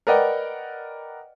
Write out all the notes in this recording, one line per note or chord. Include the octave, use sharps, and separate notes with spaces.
A#4 B4 D5 D#5 F#5 G5